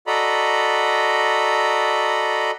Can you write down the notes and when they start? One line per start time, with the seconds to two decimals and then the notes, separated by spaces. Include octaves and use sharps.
0.07 F#4 A4 D5 D#5 A#5 B5